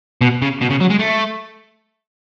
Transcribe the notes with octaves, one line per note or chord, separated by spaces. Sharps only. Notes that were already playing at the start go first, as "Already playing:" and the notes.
B2
C#3
B2
C#3
F#3
G#3
A3